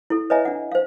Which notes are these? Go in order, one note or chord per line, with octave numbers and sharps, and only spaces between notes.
E4 A4
B4 C#5 D#5 E5 G#5 A#5
D4 F#5
C5 F5